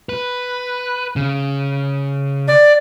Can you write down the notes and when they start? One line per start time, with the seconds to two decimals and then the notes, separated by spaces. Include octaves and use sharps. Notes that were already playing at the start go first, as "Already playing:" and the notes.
0.09 B4
1.16 C#3
2.48 D5